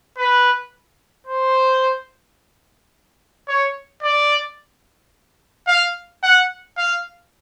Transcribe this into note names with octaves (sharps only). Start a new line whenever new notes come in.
B4
C5
C#5
D5
F5
F#5
F5